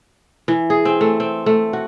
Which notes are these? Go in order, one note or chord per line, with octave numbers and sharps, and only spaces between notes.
E3
G#4
C4
A3
C4
A3
F#4